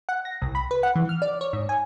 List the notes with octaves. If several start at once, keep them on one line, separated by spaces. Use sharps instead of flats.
F#5
A#6
C2
B5
B4
F#5
E3
F6
D5
C#5
G#2
G#5